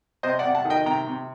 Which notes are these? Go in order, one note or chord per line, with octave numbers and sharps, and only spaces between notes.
C3 C5 D#5
D5 F#5
C3
F#5 A5
D#3
D#5 G5
C3 G5 A#5
C3